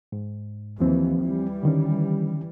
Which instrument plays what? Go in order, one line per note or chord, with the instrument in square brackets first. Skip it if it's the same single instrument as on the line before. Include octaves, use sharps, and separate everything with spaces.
[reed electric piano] G#2
[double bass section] D#2 E3 [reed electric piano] F3 C4
[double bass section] E3 G3
[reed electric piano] D3 D#3 C#4